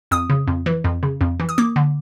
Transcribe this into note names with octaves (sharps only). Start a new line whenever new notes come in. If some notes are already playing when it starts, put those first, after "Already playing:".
F2 D#6
C#3
F2
E3
F2
C#3
F2
E3
D#6
A#3 D6
D3